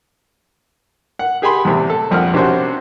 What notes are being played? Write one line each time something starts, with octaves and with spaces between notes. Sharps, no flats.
F#5
G4 G#4 G5 G#5 B5 C6
E2 A2 C3
A4
A#1 F2 F#5 F6
C3 C#4 D4 F#4 C5